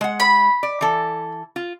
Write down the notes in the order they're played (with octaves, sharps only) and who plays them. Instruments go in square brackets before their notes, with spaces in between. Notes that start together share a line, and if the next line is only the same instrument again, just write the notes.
[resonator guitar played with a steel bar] G#3 F#5
[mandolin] B5
[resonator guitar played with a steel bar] D5
E3 A4
F4